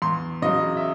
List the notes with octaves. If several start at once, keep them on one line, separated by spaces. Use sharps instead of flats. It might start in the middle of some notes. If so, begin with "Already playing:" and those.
E2 C6
C#3 F#3 D#5
E5